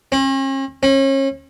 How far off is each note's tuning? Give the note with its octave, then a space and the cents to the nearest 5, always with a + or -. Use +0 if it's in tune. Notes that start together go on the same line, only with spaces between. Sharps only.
C#4 -45
C#4 -35